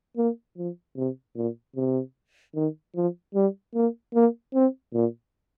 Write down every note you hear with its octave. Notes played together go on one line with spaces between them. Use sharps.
A#3
F3
C3
A#2
C3
D#3
F3
G3
A#3
A#3
C4
A#2